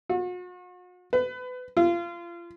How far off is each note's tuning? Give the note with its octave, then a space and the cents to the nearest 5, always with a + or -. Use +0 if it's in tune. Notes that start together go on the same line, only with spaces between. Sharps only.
F#4 -45
B4 +30
F4 -30